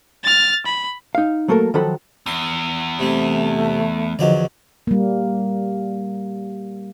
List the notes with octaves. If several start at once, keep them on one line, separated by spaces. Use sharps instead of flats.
F6 A6
B5
D#4 F5
F#3 A3 A#3 A4 A#4
D#3 F3 F#3 A4 F#5 B5
E2 D#6
C3 G3 A3
E2 D3 F3 F#3 D5 D#5
G3 A#3